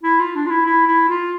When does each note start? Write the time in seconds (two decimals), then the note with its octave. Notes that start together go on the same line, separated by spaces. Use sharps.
0.03 E4
0.20 F4
0.36 D4
0.46 F4
0.50 E4
0.66 E4
0.88 E4
1.09 F4